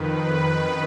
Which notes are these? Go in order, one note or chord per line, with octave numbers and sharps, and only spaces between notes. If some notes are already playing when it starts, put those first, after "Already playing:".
Already playing: F2 D#3 B4
F#2 D#3